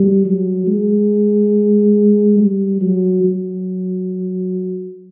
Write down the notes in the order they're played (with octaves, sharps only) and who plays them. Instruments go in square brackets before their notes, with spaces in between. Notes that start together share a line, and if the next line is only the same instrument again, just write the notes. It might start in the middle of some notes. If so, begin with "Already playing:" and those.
Already playing: [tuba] G3
F#3
G#3
G3
F#3
F#3